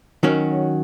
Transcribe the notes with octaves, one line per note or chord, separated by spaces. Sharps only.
D#3 F#3 C#4 F#4